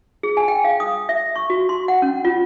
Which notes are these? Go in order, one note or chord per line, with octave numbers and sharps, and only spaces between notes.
G#4
G#5
G5
F5
D#6
E5
C#6
F#4
C6
F#5
C#4
F4